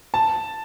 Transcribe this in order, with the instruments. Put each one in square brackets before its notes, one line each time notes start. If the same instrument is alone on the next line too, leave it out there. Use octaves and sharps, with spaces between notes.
[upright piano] A5